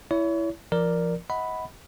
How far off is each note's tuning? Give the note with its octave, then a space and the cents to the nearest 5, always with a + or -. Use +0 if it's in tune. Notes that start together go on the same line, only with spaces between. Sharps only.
E4 +5 C#5 +35
F3 -35 A#4 +0 D5 +0
D#5 +35 F#5 +0 B5 +5